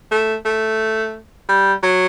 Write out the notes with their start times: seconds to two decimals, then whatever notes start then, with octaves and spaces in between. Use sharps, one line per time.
0.11 A3
0.45 A3
1.49 G3
1.83 F#3